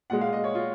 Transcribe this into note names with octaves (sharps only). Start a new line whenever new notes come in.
A#2 G#3 F#5
F5
D#5
C#5
F4